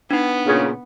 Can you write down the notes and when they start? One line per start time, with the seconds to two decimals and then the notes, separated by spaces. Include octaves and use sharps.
0.11 B3 D4 D#4
0.46 A#2 C#3